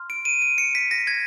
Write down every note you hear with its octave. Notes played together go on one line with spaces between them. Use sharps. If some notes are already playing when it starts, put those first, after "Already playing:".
Already playing: C6 F6
D7
D#7
D7
C#7
B6
A#6
G#6